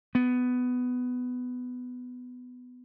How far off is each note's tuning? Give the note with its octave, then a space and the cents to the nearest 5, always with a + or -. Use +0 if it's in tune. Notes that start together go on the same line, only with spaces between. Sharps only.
B3 +15